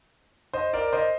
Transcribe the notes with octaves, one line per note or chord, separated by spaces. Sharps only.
C5 D#5
A#4 D5
C5 D#5